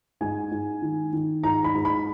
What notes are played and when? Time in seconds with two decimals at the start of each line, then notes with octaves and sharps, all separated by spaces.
0.21 G#2 G#5
0.51 G#2
0.82 D#3
1.13 D#3
1.44 G#2 A#5
1.64 B5
1.74 G#2
1.85 B5